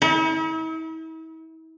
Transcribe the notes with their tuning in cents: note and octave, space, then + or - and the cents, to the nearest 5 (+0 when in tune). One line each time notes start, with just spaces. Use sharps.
E4 -45